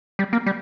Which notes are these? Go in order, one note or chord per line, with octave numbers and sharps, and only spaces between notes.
G3
A#3
G3